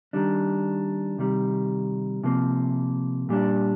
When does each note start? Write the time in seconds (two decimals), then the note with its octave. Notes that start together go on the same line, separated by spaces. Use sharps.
0.13 D#3 G3 D4
1.18 C3 D#3 G3
2.24 C3 F3 A#3
3.29 A#2 G3 D4